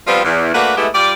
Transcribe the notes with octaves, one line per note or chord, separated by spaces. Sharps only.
F3 G3 B3 C4 F4
E2
A3 A#3 D4 F#4 B4
G#3 A3 B3 E4 G4
G3 F4 D5